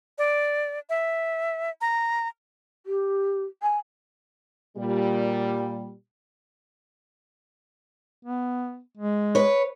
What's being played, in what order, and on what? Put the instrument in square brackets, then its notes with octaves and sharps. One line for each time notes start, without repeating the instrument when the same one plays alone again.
[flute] D5
E5
A#5
[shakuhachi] G4
G#5
[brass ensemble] A#2 G3
[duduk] B3
G#3
[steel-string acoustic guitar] B4 C#5